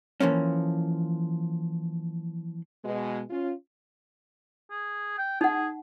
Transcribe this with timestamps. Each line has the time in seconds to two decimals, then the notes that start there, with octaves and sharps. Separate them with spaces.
0.20 E3 F3 A#3 C#4
2.84 B2 G#3
3.30 C#4 F4
4.71 G#4
5.18 G5
5.41 D#4 G#4 F#5